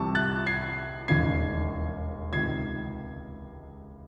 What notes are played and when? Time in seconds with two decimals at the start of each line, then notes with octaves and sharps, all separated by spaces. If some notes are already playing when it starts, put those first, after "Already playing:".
Already playing: C2 C3 E3 A5 C#6
0.15 F#6 A6
0.46 G#6 C7
1.08 E1 D#2 C#3 E3 G#6 C7
2.33 C#2 C3 D#3 G#6 C7